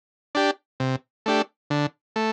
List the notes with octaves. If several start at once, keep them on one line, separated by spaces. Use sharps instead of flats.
D4 G4
C3
A3 D4 G4
D3
A3